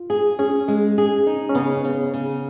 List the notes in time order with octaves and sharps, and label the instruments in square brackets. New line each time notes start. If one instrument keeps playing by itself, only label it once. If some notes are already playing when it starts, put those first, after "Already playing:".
Already playing: [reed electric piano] F4
[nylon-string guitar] G#4
[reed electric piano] C#4 [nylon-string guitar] G#4
[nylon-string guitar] G#3
G#4
D#4
[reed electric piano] C#4
[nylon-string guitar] C#3 [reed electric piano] B3
[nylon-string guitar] C#3
C#3